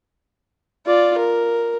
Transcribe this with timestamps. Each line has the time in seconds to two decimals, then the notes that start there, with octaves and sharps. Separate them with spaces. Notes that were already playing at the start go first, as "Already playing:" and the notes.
0.87 F4 D5
1.18 A#4